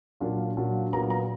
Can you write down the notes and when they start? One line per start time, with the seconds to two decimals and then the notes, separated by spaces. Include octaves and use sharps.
0.20 A#2 F#3 D4 F4
0.57 A#2 F#3 D4 F4
0.92 A#2 F#3 B3 F4 A#5
1.10 A#5